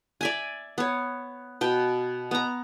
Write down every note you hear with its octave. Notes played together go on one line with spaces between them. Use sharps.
D5 E5 G#5
B3 C#5
B2 G5
B3 A#5